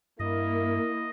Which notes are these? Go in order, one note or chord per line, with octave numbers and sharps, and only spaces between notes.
G2 A#3 E4 D#5